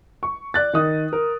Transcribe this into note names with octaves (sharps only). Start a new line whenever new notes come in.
C#6
D5 F#6 A6
D#3 D#4 D#6 F#6
A#4